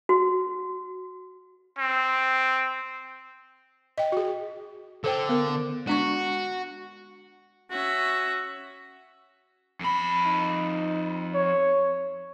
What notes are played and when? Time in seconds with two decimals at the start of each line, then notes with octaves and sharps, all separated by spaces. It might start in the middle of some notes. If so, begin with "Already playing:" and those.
0.09 F#4
1.79 C4
3.98 D#5 G5
4.12 F#4 G#4
5.04 D3 A4 C5 G5
5.29 B3 A#4
5.87 G#3 D4 F#4 C#6
7.71 C#4 F#4 E5
9.80 F2 B5
10.26 D#4
11.35 C#5